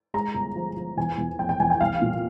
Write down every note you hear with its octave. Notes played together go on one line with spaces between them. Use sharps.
G#3 A#5
G1
F3
F3
E2 G#5
E2
F1 G5
G5
E2 G#5
G5
C2 F5
A#2